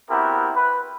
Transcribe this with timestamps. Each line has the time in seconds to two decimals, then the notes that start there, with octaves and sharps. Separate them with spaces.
0.10 B3 C4 E4 F#4 G4 A#4
0.56 B4